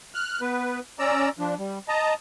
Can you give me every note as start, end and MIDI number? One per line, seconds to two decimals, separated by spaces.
0.15 0.41 89
0.15 0.41 90
0.41 0.80 59
0.41 0.80 71
0.99 1.29 61
0.99 1.29 74
0.99 1.29 82
0.99 1.29 88
1.39 1.54 53
1.39 1.54 62
1.59 1.79 55
1.88 2.14 75
1.88 2.14 81
1.88 2.14 82